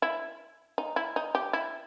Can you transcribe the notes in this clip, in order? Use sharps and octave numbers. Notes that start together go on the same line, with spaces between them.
E4
D#4
E4
D#4
G4
E4